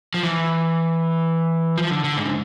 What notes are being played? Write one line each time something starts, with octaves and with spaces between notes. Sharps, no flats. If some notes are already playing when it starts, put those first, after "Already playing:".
F3
E3
F3
D3
D3
G#2
C#3